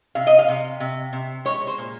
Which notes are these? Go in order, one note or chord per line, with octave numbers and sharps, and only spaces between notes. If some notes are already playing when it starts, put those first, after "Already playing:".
C3 F5
D#5
F5
C3
C3
C3
G#3 C#5
C5
A#2